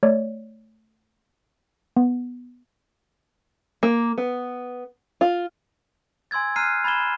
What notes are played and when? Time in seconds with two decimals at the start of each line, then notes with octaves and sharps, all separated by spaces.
0.03 A3 C#5 D5
1.97 B3
3.83 A#3
4.18 B3
5.21 F4
6.31 G#5 C6 E6 G#6 A6
6.56 A#5 F6 F#6 G#6 C7 D#7
6.84 B5 G#6 A6 E7 G7